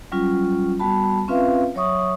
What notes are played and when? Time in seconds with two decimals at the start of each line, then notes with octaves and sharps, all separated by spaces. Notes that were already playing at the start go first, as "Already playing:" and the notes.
0.12 F#3 G3 C#4 F4
0.79 G3 B3 F#4 A5 B5
1.28 C4 C#4 F4 B4 E5 F5
1.75 F#3 C#5 E5 C#6 D#6